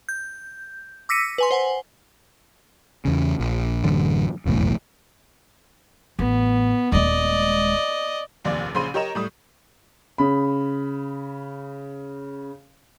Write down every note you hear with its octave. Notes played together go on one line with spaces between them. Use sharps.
G6
D6 E6 A#6 B6 C#7 D#7
B4 G#5 C6
C5 F#5 G#5
E2 C#3
A#1
A1 F#2 D3
F1 B1 E2 A2
A1 B3
D#1 G#3 D5 D#5
F1 A#1 D#2 D5
A#1 C#3 C5 B5 C6 D#7
G4 A#4 C#5 D#5 A#5 E7
A2 G3 D#6
C#3 B5